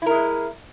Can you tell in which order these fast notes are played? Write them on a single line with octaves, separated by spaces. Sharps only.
E4 A#4 G#3